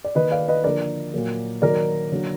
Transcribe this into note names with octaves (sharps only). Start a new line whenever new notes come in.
D5
D#3 A#3 B4 D#5
D5 F5
B4 D#5
D3 F3 A#3 A#4 D5
A#2 F#3 A#3
D#3 F#3 A#3 A#4 D5
D3 F#3 A#3